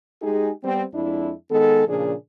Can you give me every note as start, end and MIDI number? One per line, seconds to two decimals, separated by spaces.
0.22 0.50 56
0.22 0.50 63
0.22 0.50 67
0.22 0.50 68
0.63 0.83 55
0.63 0.83 59
0.63 0.83 60
0.93 1.31 41
0.93 1.31 56
0.93 1.31 62
0.93 1.31 64
1.50 1.86 51
1.50 1.86 56
1.50 1.86 59
1.50 1.86 69
1.87 2.12 46
1.87 2.12 49
1.87 2.12 53
1.87 2.12 62
1.87 2.12 68